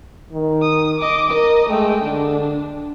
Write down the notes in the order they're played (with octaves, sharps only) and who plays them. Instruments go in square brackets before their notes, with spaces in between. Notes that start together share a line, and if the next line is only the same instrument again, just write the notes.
[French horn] D#3
[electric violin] D#6
D#5 D6
[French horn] A#4 [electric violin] D#5
[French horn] G#3 [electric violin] A3 G5
[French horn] D3 [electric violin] D4